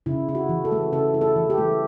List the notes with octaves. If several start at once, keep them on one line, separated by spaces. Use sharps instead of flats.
C#3 E4
E4
F#4
E3
A4
A3
C#3 A4
E4
A4
E3
G4
A3